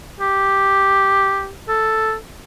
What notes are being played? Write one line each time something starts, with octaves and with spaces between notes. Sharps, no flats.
G4
A4